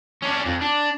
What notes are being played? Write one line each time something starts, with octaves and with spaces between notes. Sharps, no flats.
C#4 D4
F2
D4